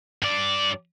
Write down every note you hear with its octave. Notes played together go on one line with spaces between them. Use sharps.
G2 D5